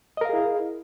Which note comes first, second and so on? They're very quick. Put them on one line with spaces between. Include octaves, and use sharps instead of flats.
D#5 A#4 F5 G#4 E4